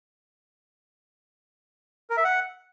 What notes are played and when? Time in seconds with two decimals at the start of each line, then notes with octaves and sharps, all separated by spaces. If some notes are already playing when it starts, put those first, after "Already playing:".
2.10 A#4
2.17 E5
2.25 F#5